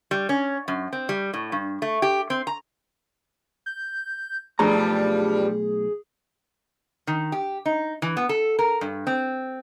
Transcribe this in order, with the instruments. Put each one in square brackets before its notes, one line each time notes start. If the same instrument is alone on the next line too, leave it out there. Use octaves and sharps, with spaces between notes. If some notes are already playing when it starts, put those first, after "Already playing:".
[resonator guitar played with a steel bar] G3
C#4
F#2
C4
G3
A2
G2
A3
G4
C4
A#5
[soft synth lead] G6
[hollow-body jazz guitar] B1 A3 A#5 [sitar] G2 F3 G3 [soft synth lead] G#4
[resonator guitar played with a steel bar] D#3
G4
D#4
E3
B3
A4
A#4
G2
C4